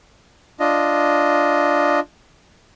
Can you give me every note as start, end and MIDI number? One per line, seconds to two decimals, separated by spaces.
0.60 2.00 62
0.60 2.00 65
0.60 2.00 75